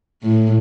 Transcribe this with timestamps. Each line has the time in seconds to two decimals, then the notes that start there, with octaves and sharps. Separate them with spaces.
0.22 A2